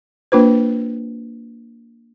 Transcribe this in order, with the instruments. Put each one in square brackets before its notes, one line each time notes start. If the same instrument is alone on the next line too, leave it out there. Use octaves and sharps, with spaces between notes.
[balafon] A#3 D4 F4 B4 C5